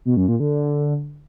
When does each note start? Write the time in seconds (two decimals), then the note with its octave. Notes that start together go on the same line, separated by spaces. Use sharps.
0.05 B2
0.17 F#2
0.28 A#2
0.40 D3